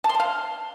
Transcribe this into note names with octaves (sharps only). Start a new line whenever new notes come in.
A5
C6
A5
F5